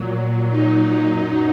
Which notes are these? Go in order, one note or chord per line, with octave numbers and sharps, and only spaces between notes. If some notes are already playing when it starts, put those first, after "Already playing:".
Already playing: A#2 F#3
D#4
D#4
F#2 F#3 D#4